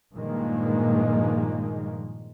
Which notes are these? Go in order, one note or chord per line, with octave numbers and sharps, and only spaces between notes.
G2 A#2 D#3 F3 G#3 A#3